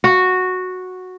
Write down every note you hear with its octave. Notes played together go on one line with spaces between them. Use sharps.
F#4